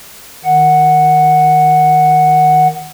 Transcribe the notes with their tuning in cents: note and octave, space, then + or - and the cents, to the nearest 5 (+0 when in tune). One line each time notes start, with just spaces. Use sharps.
D#3 +0 F#5 +0